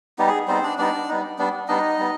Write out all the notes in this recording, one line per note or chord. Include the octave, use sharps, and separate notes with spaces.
G3 B3 D#4 G4
G#4
G3 B3 C4 D#4 C5
D4 D5
G3 B3 D4 D#4 D5
G3 B3 D#4
G3 B3 D4
G3 B3 D4 D#4 D#5
G3 B3